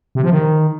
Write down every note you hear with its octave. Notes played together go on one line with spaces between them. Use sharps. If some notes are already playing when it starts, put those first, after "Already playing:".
C3
F3
D#3